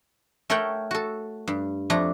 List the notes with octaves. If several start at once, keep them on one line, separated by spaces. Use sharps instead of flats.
A3 A4 A#4 C#5 F#5 G5
F#4 A4
G2
F2 A3 D4 A#5